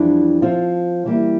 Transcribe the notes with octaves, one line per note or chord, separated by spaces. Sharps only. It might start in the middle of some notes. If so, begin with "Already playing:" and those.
Already playing: F2 E3 G3 D4
F3 C4 F4
E3 G3 A#3